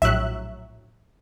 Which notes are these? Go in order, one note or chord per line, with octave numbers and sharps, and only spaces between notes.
A#1 A2 F#3 E5 F#6